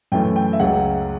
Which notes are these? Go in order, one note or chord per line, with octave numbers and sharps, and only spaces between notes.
F#2 E3 A3 G5
G5
E5
C#2 C#3 F#3 F#5